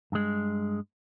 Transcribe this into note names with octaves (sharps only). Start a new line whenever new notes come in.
G2 G#3